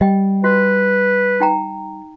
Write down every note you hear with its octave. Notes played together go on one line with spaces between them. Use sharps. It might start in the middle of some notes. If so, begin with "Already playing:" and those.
G3 D#5 G5
F#4 B4 D#5
D#4 G5 A#5